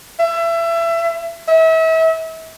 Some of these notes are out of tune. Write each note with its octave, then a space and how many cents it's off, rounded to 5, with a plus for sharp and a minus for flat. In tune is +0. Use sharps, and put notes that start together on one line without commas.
E5 +25
E5 -35